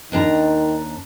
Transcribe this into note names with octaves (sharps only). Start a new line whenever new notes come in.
D#2 D#3 D4 A#5